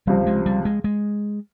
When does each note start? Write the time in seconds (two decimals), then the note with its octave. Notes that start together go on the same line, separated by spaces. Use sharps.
0.07 C#2 C3 F3 G3 C4
0.27 G#3
0.46 G3
0.65 G#3
0.84 G#3